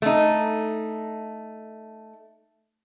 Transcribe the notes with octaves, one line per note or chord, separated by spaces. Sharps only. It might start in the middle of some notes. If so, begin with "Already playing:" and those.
A3 D#4